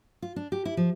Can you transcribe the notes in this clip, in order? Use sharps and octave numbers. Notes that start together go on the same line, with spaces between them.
F4
D4
G4
E4
F3